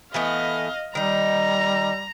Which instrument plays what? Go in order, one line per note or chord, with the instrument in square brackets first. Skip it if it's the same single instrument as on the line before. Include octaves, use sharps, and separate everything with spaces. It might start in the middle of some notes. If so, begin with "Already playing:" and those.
[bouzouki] E3 A3 B3 [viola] D#5 F5
[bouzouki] D#3 D#4 [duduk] G3 [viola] A#5